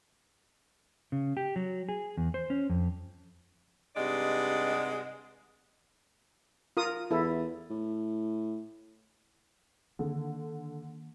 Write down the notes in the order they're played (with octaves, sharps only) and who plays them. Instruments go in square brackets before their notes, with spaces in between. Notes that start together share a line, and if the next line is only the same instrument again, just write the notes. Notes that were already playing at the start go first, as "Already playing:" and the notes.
[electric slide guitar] C#3
G4
F#3
G#4
E2
C5
C#4
F2
[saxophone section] G2 C3 G#3 D#4 D5 F#5
[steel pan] F4 A#4 D#6
[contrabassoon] E2 [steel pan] E4 A4
[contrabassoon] A2
[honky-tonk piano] D3 [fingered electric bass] D#3 A#3